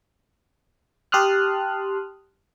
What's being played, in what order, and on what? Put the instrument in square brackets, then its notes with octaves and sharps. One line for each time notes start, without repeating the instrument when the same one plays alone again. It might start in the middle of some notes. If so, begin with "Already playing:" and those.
[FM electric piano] G4 A5 C6 D#6 F6 F#6